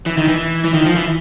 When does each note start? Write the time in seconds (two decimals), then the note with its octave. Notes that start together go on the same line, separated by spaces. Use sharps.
0.06 E3
0.18 D#3
0.28 E3
0.64 E3
0.74 D#3
0.86 F3
0.96 E3